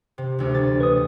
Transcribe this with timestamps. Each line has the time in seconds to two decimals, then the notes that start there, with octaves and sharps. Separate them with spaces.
0.18 C3
0.39 E1 D2
0.54 A6
0.80 B4 D#6